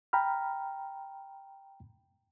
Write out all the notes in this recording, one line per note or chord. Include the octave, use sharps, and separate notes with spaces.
G5 A#5 B5 F6